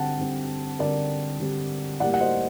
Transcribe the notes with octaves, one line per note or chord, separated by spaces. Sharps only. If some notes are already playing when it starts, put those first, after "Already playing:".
Already playing: D3 G3 C4 F#5 G5 A5
D3 G3 C4
D3 G3 C4 A#4 D5
D3 G3 C4
A2 G3 A#3 D5 F#5
F#5
C5 D#5